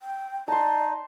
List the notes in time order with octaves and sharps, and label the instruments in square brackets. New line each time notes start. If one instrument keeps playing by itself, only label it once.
[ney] G5
[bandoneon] D#4 [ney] D5 [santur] A5 C6